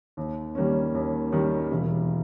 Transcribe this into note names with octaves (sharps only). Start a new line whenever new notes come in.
D#2
D#3 G3 A#3 C#4
D#2
D#3 G3 A#3 C#4
E1